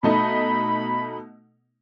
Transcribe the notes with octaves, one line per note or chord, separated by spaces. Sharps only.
B2 A3 D#4 B5